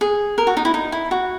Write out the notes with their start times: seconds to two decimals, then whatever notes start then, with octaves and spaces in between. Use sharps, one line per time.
0.01 G#4
0.38 A#4
0.47 F#4
0.57 D#4
0.65 E4
0.74 D#4
0.92 E4
1.11 F#4